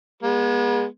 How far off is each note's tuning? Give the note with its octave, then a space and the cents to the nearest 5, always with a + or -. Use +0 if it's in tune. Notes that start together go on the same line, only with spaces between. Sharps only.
G#3 -20 B3 -40